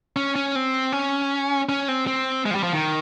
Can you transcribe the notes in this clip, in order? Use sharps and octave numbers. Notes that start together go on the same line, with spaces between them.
C#4
C#4
C4
C#4
C#4
C4
C4
G#3
F3
G3
F3
D#3